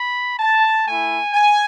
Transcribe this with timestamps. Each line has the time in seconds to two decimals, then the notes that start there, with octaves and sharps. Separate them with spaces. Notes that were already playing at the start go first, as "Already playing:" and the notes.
Already playing: B5
0.39 A5
0.86 A3 E4 G#5
1.34 G#5